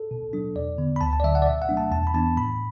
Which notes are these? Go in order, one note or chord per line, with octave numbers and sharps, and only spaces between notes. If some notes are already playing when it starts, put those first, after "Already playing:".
Already playing: A4
B2
F#3 D4
E2 D5
D3 B3
B5
D2 A5
A5
D5
D3 F#3 E5
F#5
D5
B2 E5
F#5
F#3 A3 D4
A5
E2 A5
B5
E3 B3 D4 A5
A2 B5